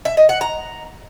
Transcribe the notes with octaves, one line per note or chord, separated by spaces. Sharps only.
E5
D#5
F#5
A#5